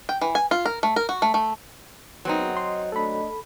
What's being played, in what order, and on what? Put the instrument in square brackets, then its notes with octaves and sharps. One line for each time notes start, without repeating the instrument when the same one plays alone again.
[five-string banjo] G5
E3
G#5
F4
A#4
A3
A#4
F#4
A3
A3
[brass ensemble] G#1 F#2 B3 [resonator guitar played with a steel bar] F#3 C4 D#4
[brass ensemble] D#5 [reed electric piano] C6
[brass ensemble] A3 D4 D#5 [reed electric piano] A4 B5